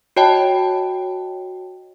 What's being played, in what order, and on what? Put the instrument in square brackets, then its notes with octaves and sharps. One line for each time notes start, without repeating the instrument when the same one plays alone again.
[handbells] F#4 C#5 D#5 G5 A5